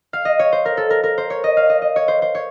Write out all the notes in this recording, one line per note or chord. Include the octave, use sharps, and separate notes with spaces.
F5
D#5
C#5
C5
A#4
A4
A#4
A#4
C5
C#5
D#5
F5
D#5
D#5
C#5
C5
C5
C#5